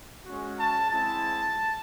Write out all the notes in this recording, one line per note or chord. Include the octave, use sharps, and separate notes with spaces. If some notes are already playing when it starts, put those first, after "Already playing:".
G#3 C#4 F#4
A5
G#3 C4 E4 A5